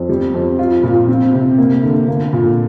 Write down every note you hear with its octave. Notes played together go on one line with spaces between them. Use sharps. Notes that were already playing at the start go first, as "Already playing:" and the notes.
Already playing: F2
G3
F2
F4
A#2
C4
C3
A#3
D3
A#3
A#2